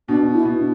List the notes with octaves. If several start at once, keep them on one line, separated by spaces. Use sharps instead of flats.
B2 D4
E4
B2
D4